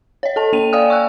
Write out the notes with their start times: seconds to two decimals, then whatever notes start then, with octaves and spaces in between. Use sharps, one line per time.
0.23 C#5 D#5
0.36 A4 A5
0.53 A#3 G5 D#7 F7
0.73 D5 F5 G5 G#5 D#6 F6
0.90 C#6 E6 F#6